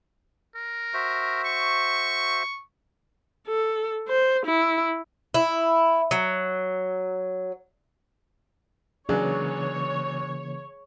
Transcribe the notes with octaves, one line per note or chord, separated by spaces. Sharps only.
A#4
F#4 C5 E5
C#6
A4
C5
E4
E4
F#3
C#2 C#3 E3 F#3 A#3 D4 G#4 C#5